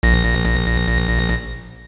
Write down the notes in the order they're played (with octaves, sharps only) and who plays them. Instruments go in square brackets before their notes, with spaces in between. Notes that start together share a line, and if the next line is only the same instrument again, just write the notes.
[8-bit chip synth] A#1 A#6